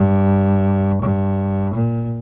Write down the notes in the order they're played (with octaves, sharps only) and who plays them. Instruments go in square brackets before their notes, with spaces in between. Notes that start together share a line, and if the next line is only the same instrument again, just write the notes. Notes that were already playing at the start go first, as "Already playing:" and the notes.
Already playing: [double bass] G2
G2
A#2